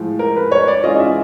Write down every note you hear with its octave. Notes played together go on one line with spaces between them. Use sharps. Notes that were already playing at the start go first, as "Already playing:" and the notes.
Already playing: A2 F3 G#3
A#4
B4
C#5
D5
E3 G#3 C#4 F4 D#5
D#5
E5